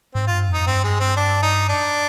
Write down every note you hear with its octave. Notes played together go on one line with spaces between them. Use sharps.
G#2 C4
G2 F4
F2 D#4
G2 C4
G#3
C4
D4
D#4
D4